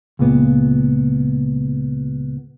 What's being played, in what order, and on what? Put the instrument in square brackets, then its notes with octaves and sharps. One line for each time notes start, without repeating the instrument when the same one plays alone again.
[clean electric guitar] C#2 A#2 B3